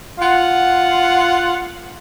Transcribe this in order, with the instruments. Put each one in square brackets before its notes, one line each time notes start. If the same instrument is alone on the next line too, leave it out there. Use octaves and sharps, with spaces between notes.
[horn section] F4 F#5